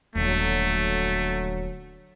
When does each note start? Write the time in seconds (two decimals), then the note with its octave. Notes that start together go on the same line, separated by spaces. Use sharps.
0.15 D#1 D3 F#3 A3